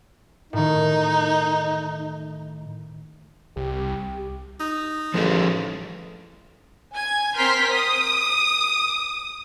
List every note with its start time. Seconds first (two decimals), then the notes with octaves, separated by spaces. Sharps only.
0.53 A2 D#3 D#4
3.57 C2 G4
4.60 D#4
5.14 A1 F3 G#4 A4
6.95 G#5 G#6
7.36 C4 A#4 C6 F6 G6 B6
7.72 D#6